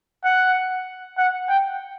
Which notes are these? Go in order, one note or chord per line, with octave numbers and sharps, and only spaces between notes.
F#5
F#5
G5